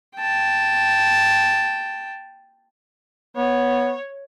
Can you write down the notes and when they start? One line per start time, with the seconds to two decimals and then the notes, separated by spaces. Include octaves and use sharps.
0.18 G5 A5
3.37 B3 C#5